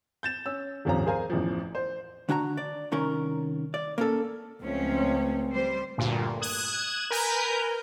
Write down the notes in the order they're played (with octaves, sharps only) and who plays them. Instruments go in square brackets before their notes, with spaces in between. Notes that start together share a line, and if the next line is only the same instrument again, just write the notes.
[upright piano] G6 A6 E7
C#4 E6
D#1 G#1 F3 C#4 F5 A#5
G#4 A#4 C5 F5 G#5 A#5
A1 E2 F3
C5
[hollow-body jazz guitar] D3 D4 F#4 G#5 A#5
D5
C2 D#3 C#4 A#4
D5
A#3 C#4 A4
[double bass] C#2 C4 [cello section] F3 A3 C#4
[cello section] G3 C5
[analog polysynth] D2 G2 A#2
D#6 F#6 G#6 E7
A#4 B4 G#5 A#5 G6